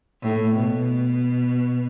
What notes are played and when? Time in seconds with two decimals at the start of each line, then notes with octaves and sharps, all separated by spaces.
0.23 A2
0.56 B2